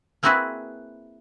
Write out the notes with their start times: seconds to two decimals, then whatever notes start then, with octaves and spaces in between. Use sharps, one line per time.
0.23 A#3 C4 E4 F#4 G#4 B4